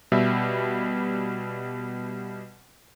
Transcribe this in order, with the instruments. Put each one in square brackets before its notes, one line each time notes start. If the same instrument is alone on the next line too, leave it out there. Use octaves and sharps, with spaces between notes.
[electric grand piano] B2 G3 E5